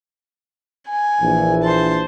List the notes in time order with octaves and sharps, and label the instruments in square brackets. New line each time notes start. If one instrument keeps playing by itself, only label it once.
[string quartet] G#5
[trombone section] A#1 E3
[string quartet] C5 A5